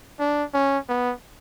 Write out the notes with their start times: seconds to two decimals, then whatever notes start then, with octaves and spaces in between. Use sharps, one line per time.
0.20 D4
0.54 C#4
0.89 B3